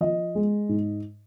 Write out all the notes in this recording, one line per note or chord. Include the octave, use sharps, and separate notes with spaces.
F3 D#5
G#3
G#2